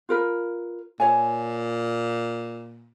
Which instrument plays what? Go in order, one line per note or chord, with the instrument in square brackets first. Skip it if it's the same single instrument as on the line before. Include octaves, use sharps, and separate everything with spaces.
[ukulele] F4 A#4 B4
[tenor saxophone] A#2 [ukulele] C#5 G#5